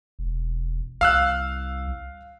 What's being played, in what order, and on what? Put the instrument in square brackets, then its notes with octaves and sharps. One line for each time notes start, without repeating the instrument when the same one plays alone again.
[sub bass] E1
[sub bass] C2 [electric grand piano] F5 E6 F#6